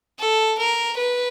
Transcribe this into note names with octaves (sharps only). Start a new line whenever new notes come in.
A4
A#4
B4